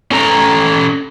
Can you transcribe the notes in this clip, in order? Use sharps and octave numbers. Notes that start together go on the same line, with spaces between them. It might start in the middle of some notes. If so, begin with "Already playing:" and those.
C#4 A4 A#5